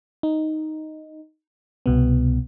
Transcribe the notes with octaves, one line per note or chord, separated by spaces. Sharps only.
D#4
C2 B2 B3